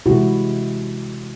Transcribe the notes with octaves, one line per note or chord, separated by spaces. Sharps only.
C3 E3 G#3 E4 F#4